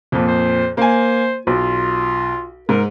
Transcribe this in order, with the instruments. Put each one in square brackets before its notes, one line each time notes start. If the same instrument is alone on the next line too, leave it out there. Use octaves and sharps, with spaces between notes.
[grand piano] F2 A#2
[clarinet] C5
[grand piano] A#3 G#5 [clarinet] C5
[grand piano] B1 [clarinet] F4
[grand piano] G#2 [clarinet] A#4